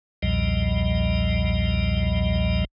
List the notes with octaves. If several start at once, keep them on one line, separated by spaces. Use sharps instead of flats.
B1 E2 A#2 F3 G3 D#5